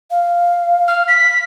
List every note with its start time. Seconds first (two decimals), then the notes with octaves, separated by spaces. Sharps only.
0.11 F5
0.88 F6
1.08 B6